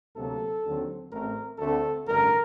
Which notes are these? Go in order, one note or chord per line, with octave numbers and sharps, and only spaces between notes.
D2 C3 F#3 A#3 A4
D#2 D3 F#3 C4
A1 A2 A3 C4 A#4
D2 D3 A3 C4 A4
A1 G2 D3 A#4